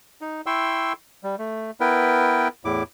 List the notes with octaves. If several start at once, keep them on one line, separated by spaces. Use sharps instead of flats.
D#4
E4 G5 C6 C#6 E6
G3
A3
B3 E4 A#4 B4 G5
E2 A2 E4 D6